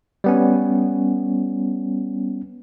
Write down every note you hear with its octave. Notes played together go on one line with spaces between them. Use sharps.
G3 B3 C#4